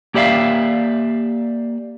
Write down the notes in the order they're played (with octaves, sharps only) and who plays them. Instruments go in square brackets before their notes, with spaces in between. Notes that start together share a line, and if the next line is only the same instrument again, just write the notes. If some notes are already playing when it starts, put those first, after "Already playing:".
[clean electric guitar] A#3 G4 D5 E5 F5